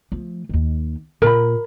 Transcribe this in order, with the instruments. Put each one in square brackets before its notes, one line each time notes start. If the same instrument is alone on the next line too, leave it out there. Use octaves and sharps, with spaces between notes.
[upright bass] F3 A3
D#2 D#3
[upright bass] A#2 [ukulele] A#4 B5